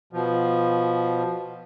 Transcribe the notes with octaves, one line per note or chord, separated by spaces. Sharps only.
B2 F3